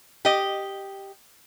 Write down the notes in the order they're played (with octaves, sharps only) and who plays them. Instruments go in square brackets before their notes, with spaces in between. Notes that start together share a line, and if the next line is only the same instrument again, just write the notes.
[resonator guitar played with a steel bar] G4 D#5